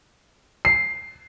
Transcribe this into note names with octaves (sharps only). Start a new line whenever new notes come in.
C7